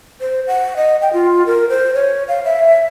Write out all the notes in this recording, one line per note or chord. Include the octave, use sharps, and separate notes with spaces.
C5
F#5
D#5
G5
F4
A#4
C5
C#5
F5
E5